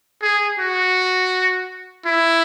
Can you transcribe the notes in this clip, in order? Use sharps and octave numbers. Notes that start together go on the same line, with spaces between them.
G#4
F#4
E4